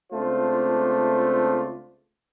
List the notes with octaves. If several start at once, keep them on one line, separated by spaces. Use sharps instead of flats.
C#2 A3 C4 D4 F4 C5